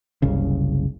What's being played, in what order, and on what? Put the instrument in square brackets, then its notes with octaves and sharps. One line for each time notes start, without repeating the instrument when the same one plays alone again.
[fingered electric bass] F#1 C2 C#3